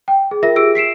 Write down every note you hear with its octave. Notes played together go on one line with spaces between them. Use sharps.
G5
G#4
F4 A#4 E5 A#6
F4 G4 G#4 E6 D7
B6 C7 D7 E7